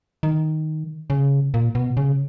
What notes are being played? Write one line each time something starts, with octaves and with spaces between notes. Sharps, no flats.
D#3
C#3
A#2
B2
C#3